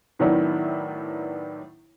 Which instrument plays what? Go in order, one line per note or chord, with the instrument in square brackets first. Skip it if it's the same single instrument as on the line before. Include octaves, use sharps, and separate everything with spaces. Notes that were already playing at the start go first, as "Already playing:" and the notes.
[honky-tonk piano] A2 D#3 F#3 B3 D4 E4